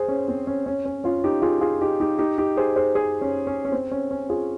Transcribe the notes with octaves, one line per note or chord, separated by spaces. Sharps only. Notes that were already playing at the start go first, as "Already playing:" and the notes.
Already playing: G#4 C5
C#4
C4
C#4
C#4
C#4
C#4 F4
D#4 G4
F4 G#4
F4 G#4
D#4 G4
D#4 G4
D#4 G4
D#4 G4
G#4 C5
G#4 C5
G#4 C5
C#4
C#4
C#4
C4
C#4
C#4
F4 G#4